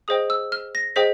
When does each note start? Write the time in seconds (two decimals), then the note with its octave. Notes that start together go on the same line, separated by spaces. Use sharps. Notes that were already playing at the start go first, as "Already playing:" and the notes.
0.08 G#4 C5 D#5 G5 D#6
0.30 E6
0.52 F6
0.75 A#6
0.96 G#4 C5 D#5 G5 B6